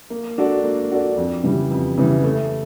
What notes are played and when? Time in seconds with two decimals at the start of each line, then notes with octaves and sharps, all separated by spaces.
0.10 A#3
0.38 D4 F#4 A4 D5
0.64 A#3
0.91 D4 F#4 A4 D5
1.17 F2
1.43 C#3 E3 G3 B3
1.71 F2
1.98 C#3 E3 G3 B3
2.24 A3